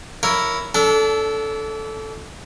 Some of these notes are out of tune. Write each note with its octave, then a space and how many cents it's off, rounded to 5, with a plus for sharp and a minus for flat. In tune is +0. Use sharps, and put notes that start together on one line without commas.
E4 +0 A#4 +0 C#5 +15
D4 -35 A4 -5